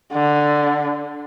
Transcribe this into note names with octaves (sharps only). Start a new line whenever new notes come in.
D3